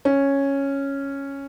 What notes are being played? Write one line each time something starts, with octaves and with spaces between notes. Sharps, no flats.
C#4